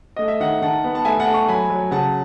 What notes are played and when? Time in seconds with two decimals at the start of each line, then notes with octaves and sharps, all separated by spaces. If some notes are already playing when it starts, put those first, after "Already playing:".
0.16 A3 D#5
0.28 E5
0.40 D#3 D#5 F#5
0.62 D#3 F#5 A5
0.84 B3
0.95 A5
1.05 A3 E5 G#5
1.20 F#5 A5
1.27 A3
1.34 A5 C#6
1.48 F#3 G#5 B5
1.70 F#3
1.91 C#3 F#5 A5